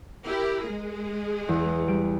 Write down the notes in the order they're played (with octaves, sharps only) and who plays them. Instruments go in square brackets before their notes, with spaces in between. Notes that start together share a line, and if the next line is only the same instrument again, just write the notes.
[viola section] E4 G4 A#4
G#3 G#4
[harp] E2
G3 D7